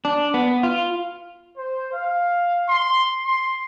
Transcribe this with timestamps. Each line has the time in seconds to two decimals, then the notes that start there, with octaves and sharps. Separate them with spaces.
0.05 D4
0.34 B3
0.63 F4
1.57 C5
1.93 F5
2.68 C6
3.26 C6